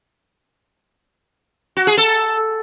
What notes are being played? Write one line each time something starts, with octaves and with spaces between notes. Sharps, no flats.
F#4
G#4
A4